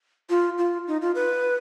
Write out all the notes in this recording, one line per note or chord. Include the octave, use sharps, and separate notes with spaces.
F4
F4
D#4
F4
B4